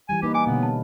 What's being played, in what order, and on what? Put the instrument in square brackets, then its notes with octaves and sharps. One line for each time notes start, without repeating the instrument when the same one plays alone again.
[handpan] E3 G3 [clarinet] G#5
[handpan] A#3 D#4 B4 [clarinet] G4
[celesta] G#5 [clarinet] D6
[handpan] B2 D3 C#4 [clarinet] B3
[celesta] A5